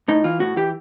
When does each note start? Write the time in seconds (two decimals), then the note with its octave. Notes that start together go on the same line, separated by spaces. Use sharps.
0.08 A2 D#4
0.24 E3 F4
0.40 A2 F#4
0.56 E3 G4